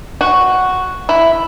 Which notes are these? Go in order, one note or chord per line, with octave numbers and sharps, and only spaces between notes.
F#4
E4